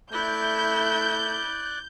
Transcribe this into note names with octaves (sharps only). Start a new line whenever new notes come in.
A3 E4 D5 F#6 G6